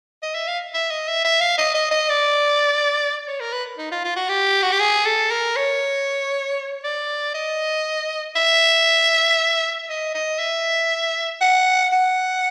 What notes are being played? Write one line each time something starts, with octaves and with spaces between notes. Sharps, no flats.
D#5
E5
F5
E5
D#5
E5
E5
F5
D#5
D#5
D#5
D5
C#5
A#4
B4
D#4
F4
F4
F#4
G4
F#4
G4
G#4
A4
A#4
C#5
D5
D#5
E5
D#5
D#5
E5
F#5
F#5